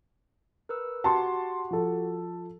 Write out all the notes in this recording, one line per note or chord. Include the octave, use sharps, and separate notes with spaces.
A#4 B4 E6
F#4 G4 F#5 A5 C6
F3 A4